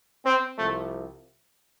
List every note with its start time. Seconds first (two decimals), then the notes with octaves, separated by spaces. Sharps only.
0.25 C4
0.58 C2 C3 F3 A3